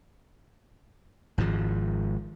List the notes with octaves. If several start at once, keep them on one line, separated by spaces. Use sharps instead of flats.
G#1 G#2 F3